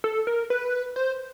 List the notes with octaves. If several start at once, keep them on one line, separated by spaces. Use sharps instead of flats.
A4
A#4
B4
C5